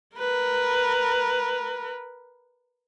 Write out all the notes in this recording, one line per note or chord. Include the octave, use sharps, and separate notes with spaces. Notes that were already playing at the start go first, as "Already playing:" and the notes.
A#4 B4